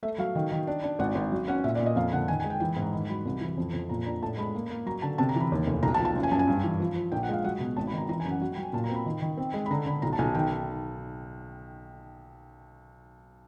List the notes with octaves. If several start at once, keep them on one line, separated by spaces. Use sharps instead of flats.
A3 E5
F#3 F5
D#3
D#3
D4
D4
G#1 F#5
G#1
F#3
C#4 F#5
A#2 E5
D5
A#2
D#5
F2 F5
D3 F#5
D#3 G#5
G#5
G#3
G5
E3 G5
G#2
A#5
D#3 B5
F#3 B5
C2
E3
F2
F2
A#2 A#5
D4 A#5
A2 A5
G#3 B5
A#3
A#3
F#3 A#5
D3 A5
C3 A5
A#5
E3 B5
D#2
F1
B1 A#5
A5
F3
A5
F#1
G#5
F#2 A5
G#5
G2
E3
F3
F3
A#1 G5
F#5
G#3 F5
F#3 F#5
B2
G#1 A5
B5
D#3 A#5
E3 A#5
G#5
F#2
F#5
F#3 F#5
G5
F#3
G#5
A#2 A5
A#5
C4 B5
D#3
D#3
C4
G#3
B5
D3 A#5
D3 B5
B1 A#5
A5
B1 G#5
D#3 G5